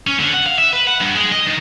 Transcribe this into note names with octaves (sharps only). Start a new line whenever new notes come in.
C#4
D3
F#5
F5
E5
B4
F#5
G2
G#3
D#5
D#3